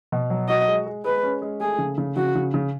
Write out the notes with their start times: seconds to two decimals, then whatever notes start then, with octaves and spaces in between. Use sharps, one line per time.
0.12 B2
0.30 F#3
0.49 F#4 D#5
0.68 G#3
0.86 G#3
1.04 G#3 B4
1.23 C#4
1.42 G#3
1.61 A3 G#4
1.78 C#3
1.98 C#3
2.16 C#3 F#4
2.35 C#3
2.54 C#3